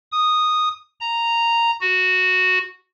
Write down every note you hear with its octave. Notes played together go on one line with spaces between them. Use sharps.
D#6
A#5
F#4